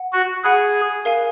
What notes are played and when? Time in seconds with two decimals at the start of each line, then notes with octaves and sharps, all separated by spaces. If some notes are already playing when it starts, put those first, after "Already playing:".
Already playing: F#5
0.13 F#4
0.44 G#4 F#5 B5 F#6
1.05 A#4 F5 G#5